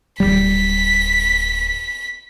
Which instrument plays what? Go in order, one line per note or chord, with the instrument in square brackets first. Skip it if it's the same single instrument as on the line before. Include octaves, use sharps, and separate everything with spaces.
[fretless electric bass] D1 G#1 G3 [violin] B6